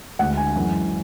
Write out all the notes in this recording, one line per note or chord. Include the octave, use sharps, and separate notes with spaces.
D2 D3 G#3 F#5
G#5
F#2 E3 G#3